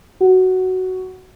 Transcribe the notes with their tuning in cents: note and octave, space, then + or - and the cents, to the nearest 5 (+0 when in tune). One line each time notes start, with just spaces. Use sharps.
F#4 +10